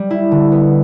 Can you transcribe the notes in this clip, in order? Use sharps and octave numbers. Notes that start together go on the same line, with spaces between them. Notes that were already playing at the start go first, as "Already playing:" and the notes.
Already playing: G3
E4
D3
B3